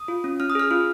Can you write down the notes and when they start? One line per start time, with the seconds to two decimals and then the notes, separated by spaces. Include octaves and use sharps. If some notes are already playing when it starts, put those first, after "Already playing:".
Already playing: D#6
0.08 F4
0.24 C#4
0.40 C#4 F6
0.50 D#6
0.55 G#4 F6
0.71 F4